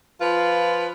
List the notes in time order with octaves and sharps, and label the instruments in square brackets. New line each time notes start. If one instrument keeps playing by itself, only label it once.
[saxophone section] F3 F4 B4